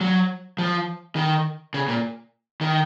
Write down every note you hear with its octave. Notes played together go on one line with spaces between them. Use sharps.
F#3
F3
D#3
C#3
A#2
D#3